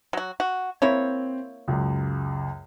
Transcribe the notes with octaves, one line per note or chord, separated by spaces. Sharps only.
F#3 F#4
F#4
A#3 C4 E4 C#5
C#2 F#2